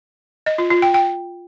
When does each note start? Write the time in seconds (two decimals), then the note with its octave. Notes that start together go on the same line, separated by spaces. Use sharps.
0.46 D#5
0.58 F4
0.70 F4
0.82 G5
0.94 G5